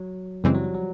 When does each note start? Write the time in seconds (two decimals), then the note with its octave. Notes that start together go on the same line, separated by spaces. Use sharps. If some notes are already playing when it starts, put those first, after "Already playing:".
Already playing: F#3
0.44 F#2 C#3 E3 G3 G#3 C4
0.54 F#3
0.64 F3
0.74 F#3